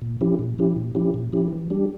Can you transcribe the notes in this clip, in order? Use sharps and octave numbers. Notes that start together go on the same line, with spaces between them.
A#2
F3 C#4 E4 G4
A#2
F3 C#4 E4 G4
A#2
F3 C#4 E4 G4
A#2
F3 C#4 E4 G4
E3
G3 D4 G4